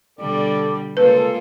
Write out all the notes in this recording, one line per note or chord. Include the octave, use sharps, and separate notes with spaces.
B2 D3 G3 A4 D5
C#3 G#3 A#3 F4 A4 B4